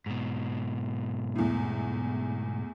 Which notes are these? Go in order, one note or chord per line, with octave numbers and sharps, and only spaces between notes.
G#2 B2
E2 A2